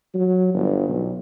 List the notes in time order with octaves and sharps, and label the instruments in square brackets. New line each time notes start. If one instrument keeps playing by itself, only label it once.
[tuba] F#3
G1
B1